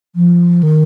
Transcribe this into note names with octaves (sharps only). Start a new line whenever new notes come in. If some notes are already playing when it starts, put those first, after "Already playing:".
F3
D#3